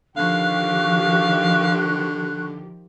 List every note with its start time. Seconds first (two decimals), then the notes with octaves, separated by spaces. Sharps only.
0.17 D3 D#3 F3 G4 F5 C#6 F#6